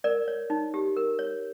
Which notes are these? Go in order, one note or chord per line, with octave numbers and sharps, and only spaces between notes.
A#4 D5
C#5
D#4
G4
A#4
C#5